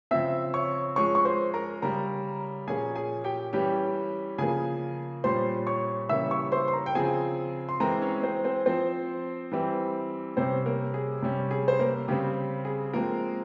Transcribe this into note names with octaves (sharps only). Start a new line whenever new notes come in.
C#3 F3 C4 E5 E6
C#5 C#6
F3 G#3 C#4 C#5 C#6
C#6
C5 C6
A#4 A#5
C#3 G3 C#4 A#4 A#5
A#2 F3 A#3 C#4 G#4 G#5
G#4 G#5
G4 G5
E3 G3 C#4 G4 G5
C#3 F3 A#3 G#4 G#5
A#2 G3 C#4 C5 C6
C#5 C#6
C#3 E3 G3 A#3 C#4 E5 E6
C#5 C#6
C5 C6
C6
A#4 A#5
G5
C#3 F3 C4 G#4 G#5
C6
E3 G#3 C4 A#4 A#5
C#4 C#5
C4 C5
C4 C5
F3 C4 C5
E3 G3 C4
C3 G3 C4 C#4 C5
A#3 A#4
G#4
C3 G3 C#4
G#4
C5
A#3 A#4
C#3 G3 C4 G4
G#4
F3 G#3 A#3 C4 A#4